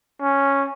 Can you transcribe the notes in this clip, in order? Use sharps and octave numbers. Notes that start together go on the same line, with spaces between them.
C#4